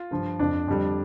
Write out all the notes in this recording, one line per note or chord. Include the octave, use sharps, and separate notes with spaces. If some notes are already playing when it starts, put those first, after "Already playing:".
Already playing: F4
G2 F3
F2 F3 D4
F2 D3 G3